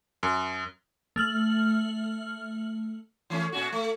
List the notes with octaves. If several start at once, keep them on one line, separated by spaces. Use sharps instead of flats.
F#2
A3 F6 F#7
E3 A3 C#4
A#2 C#4 F#4
A3